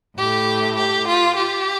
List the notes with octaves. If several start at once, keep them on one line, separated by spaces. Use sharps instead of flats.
A2 A3 G4
G4
F4
G4